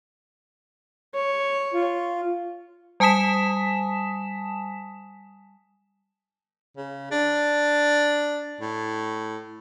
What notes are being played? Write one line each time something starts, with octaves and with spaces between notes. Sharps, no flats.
C#5
F4
G3 G#5 A5 D#6 B6 E7
C#3
D4
A2